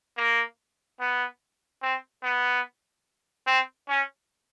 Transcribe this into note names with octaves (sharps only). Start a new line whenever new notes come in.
A#3
B3
C4
B3
C4
C#4